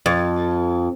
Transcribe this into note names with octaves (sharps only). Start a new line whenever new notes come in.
F2